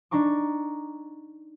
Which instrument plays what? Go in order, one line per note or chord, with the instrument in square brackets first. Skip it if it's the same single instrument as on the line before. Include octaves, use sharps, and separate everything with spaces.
[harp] D4 D#4 A#5 C#6 D6